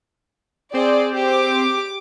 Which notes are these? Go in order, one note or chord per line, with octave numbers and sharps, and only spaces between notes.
C4 G#4 C5 D5
G4 D6